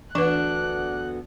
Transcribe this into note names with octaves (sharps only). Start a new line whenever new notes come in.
D2 E3 B3 D4 B4 F#6